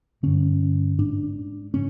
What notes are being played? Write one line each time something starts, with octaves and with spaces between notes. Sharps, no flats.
G2 D3 C#4
G#2 D4
C#3 C#4